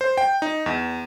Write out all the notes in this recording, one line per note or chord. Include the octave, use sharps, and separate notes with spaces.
C5
G5
D#4
E2